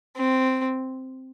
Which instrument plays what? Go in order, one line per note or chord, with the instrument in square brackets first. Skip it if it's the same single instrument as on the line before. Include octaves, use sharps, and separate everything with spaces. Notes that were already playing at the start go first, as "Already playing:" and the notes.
[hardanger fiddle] C4